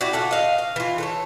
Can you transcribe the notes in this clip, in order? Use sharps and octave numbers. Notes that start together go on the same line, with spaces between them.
E4 F#4 G4 D5
F4 F#4 A4
D#5 F5
F5
E3 F4
A4 B4 C#5